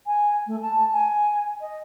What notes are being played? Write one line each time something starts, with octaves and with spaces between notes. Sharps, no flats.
G#5
A3
A5
G#5
D#5